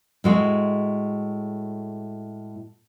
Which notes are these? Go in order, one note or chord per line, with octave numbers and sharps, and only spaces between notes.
A2 G#3 F#4